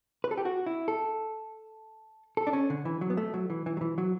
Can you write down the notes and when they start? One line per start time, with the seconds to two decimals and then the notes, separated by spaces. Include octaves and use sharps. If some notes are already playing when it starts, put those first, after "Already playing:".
0.24 B4
0.31 A4
0.38 G4
0.45 F#4
0.66 E4
0.88 A4
2.37 A4
2.47 D4
2.53 C#4
2.70 D3
2.85 E3
3.01 F#3
3.10 B3
3.17 A3
3.34 F#3
3.50 E3
3.66 E3
3.77 F#3
3.81 E3
3.98 F#3